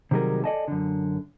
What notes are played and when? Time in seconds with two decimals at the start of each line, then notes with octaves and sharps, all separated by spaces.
0.11 C3 D#3 F#3 G3 G#4 A#4
0.44 A4 D5 D#5 G#5 A5
0.68 F#2 D3